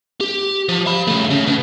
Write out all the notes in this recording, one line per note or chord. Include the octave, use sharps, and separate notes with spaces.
G4
F3
F5 B5
C#3 A3
C#3
B2